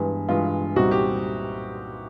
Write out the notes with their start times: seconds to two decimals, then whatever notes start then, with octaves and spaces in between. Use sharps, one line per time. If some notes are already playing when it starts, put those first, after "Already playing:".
Already playing: G2 E3 G#3 B3
0.29 G2 E3 G#3 B3 F4
0.76 C2 A#2 G3 C4 D#4 F#4
0.91 G4